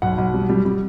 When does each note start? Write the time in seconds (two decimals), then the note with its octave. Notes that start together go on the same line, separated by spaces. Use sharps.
0.02 B1 F#5
0.18 B1
0.34 G3
0.49 G3
0.65 G3